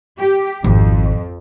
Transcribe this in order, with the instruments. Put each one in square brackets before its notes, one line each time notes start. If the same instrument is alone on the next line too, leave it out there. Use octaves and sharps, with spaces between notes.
[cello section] G4
[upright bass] G#1 [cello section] F2